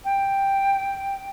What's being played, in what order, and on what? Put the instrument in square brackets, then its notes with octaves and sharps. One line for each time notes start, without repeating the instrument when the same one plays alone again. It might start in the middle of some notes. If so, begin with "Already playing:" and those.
[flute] G5